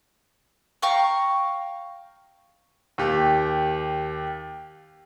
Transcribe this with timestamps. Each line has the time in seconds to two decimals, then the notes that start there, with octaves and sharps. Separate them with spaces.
0.82 F5 G5 A#5 C#6
2.98 D#2 G4